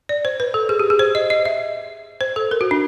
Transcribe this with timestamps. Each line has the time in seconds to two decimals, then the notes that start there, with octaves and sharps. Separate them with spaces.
0.09 D5
0.25 C5
0.40 B4
0.54 A4
0.69 G#4
0.80 G4
0.90 G#4
0.99 C5
1.15 D#5
1.30 D#5
1.45 E5
2.21 C5
2.36 A4
2.51 A#4
2.61 F#4
2.71 D4